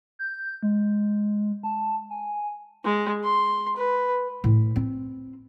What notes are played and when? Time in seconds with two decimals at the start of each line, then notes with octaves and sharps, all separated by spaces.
0.19 G6
0.63 G#3
1.63 A5
2.10 G#5
2.84 G#3
3.24 C6
3.76 B4
4.44 A2
4.76 C4